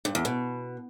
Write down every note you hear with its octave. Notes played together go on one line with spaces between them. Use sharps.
G2
E2
B2